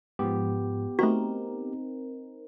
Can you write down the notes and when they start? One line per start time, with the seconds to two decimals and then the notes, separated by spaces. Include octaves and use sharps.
0.19 G#2 F3 B3 G4
0.99 A3 C4 D#4 F#4 A#4